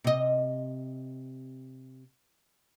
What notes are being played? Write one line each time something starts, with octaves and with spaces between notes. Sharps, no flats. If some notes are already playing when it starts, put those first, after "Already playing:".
C3 D#5